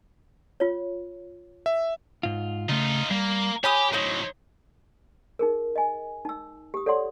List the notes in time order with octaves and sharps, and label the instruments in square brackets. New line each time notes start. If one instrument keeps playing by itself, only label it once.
[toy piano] F4 C#5
[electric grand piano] E5
[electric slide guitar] G#2 F4
[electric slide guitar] C#3 A3 [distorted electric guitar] D#4 F4
[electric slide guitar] G3 [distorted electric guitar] A#3
[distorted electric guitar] G4 [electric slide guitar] C#5 [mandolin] G#5 B5 D#6
[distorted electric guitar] A2 F#3 [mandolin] D#4 C5
[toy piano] D#4 G#4 A#4
D#5 G#5
D#4 E6
G4 D#6
A4 C#5 D5 F#5 C6